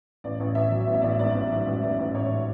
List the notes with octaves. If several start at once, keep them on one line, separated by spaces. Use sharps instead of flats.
A1 D5
A1
A1 E5
F#3
A1
E5
A1 D5
E5
G#2 D5
A1
F#3 E5
A1
A1 D5
A1
A1 C#5